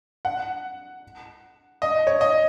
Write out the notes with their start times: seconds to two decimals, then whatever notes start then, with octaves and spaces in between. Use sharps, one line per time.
0.25 F#5
1.82 D#5
2.07 C#5
2.21 D#5